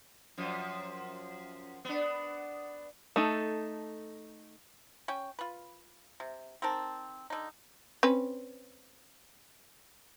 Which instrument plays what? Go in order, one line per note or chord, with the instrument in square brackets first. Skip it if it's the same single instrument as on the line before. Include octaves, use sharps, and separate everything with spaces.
[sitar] F#2 F3
B3 D4
[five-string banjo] A3 D#4 A4
[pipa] C#4 G5
F4 B4
C3
C4 D#4 A#4 A5
D3 D#4
[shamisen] C4 C#4 B4